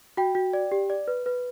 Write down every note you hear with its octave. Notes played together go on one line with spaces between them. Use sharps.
F#4 G5
F#4
D5
G4
D5
B4
B4